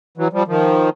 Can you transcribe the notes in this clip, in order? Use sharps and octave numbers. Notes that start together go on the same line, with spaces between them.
E3 F#3
F3 G3
D#3 F3